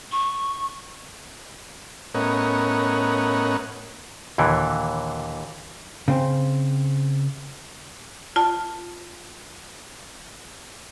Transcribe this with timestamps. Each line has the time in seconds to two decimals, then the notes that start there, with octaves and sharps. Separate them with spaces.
0.12 C#6
2.14 A2 B3 C#4 A#4 D#5 F#5
4.38 D#2 A#2 D3 E3
6.08 C#3 C4
8.36 F4 A5